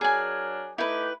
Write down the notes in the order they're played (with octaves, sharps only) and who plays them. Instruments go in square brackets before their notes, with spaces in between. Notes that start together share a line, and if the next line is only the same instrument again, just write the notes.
[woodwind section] F#3 D4 A#4 [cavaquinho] G#4 G#5
[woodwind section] A3 D#4 G4 [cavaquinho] E4 B4